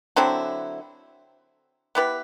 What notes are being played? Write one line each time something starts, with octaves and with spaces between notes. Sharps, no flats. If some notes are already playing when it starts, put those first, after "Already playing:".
D3 F#3 C4 E4
B3 E4 G4 B4